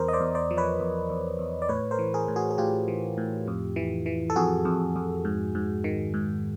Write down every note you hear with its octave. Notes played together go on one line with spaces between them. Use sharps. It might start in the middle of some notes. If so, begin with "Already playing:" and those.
Already playing: E2 A#4 C5
D#5
C5 D5
E2
C5 D5
F3
B4 C#5
E2
E2
E2
D5
A2 B4 C#5
A#4 C5
E3
G#4 A#4
A2
F#4 G#4
G#4
A2 F4 G4
E3
A2
F2
E3
E3
A4
F2 F#4 G#4
F2
F2
G#2
G#2
D#3
G#2